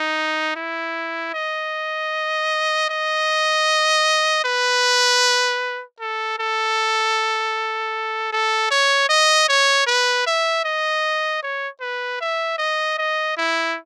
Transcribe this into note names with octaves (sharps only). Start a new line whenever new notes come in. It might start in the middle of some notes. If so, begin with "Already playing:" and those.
Already playing: D#4
E4
D#5
D#5
B4
A4
A4
A4
C#5
D#5
C#5
B4
E5
D#5
C#5
B4
E5
D#5
D#5
E4